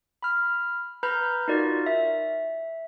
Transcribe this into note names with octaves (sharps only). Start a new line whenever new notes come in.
B5 F6
B4 A#5 B5 F6 G6
D#4 F4 F#4 A#4 D5
E5